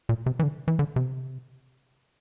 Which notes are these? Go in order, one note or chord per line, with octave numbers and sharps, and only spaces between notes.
A#2
C3
E3
D3
E3
D3
C3